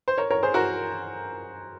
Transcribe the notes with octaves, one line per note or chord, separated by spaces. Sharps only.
C5
A#4 C#5
A#4 C#5
G#4 C5
F#4 A#4